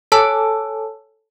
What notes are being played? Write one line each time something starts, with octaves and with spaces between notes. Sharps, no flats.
A4 C#5 G#5 A5 E6